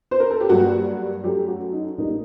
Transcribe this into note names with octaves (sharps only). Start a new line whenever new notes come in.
C5
A#4
A4
G4
G2 F#3 A#3 F#4
F#2 F#3 A3 G4
F#4
D#4
A#1 A2 G3 A#3 D#4